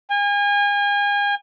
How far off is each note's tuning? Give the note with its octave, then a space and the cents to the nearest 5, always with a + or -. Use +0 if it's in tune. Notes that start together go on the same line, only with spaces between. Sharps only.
G#5 -35